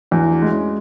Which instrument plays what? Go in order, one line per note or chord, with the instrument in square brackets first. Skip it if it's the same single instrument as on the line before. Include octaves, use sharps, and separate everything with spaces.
[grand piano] E2 [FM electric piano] D4 F#4
[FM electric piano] E4
D4 F#4
[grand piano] G#3 [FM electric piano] F#4
[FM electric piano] C#4 E4